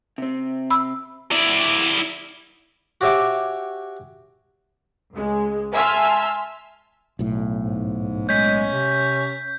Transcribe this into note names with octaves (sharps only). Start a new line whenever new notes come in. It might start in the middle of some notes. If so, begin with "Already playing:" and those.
C3 C4
B5 E6
E4 D5
F#4 G4 C#5 E5 G#5 D6
C#2 G#3
E5 G#5 A5 C6 E6 F6
B1 A2
G#2
G#3 C#4 G6 B6
C3